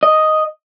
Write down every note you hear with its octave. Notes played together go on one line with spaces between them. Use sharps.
D#5